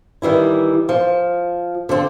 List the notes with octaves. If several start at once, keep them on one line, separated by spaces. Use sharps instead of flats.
D#3 E3 G3 E4
F3
D3 F3 C4 A4